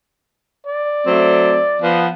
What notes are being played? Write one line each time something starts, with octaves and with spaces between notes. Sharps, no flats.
D5
F#3 A3 C4
F3 B3